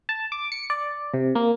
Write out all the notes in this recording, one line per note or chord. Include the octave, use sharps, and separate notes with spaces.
A5
D6
C#7
D5
C3
A#3